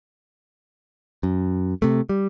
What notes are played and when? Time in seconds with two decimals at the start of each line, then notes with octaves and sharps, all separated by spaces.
1.23 F#2
1.82 C3 A3
2.09 G3